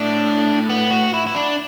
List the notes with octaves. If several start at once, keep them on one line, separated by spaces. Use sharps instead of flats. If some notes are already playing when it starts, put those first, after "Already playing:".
Already playing: A2 D4
B3
F#4
E4
E4
D4